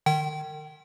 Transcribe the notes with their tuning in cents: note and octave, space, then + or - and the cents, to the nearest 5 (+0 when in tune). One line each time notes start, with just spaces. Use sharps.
D#3 -40 G5 -30